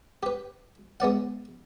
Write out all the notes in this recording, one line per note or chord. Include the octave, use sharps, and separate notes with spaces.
G4 B4
G#3 B3 D5 F#5